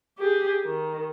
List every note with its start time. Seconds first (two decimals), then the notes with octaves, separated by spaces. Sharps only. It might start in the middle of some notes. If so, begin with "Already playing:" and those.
0.18 G4 G#4
0.64 D#3